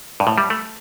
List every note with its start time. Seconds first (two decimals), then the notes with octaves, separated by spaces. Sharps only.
0.20 G2
0.27 A2
0.38 G3
0.50 A3